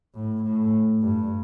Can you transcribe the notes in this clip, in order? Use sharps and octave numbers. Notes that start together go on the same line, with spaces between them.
A2
A2
G2